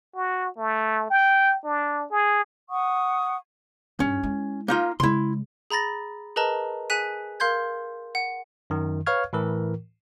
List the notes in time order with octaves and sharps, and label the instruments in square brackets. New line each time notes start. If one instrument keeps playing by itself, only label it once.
[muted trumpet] F#4
A3
G5
D4
G#4
[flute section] F#5 C#6 D#6
[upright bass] G2 [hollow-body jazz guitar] C#4
[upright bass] G#3 E4
[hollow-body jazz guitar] A#3 D#4 F4
[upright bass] C#3 G#3 [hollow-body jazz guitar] E4 C6
[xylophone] G#4 A#5 B5 A6 A#6
G#4 A#4 B4 D#5 A5 A#5
G#4 G#5 F#6 B6 D#7
A#4 F5 C6 G6 G#6
F#5
[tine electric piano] F#2 D#3
B4 C#5 F5 C#6 F6 G#6
A2 E3 A#4